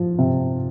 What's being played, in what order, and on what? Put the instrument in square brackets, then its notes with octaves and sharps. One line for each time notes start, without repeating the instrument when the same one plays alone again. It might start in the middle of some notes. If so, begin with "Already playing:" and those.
Already playing: [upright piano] F3
C3